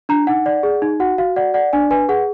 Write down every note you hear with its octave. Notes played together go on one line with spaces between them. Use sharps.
D4 A#5
D#4 F#5
D5
G#4
D#4
F#4 F#5
F#4 F5
D5 F#5
D5 F#5
D4 G#5
B4 G#5
G#4 F#5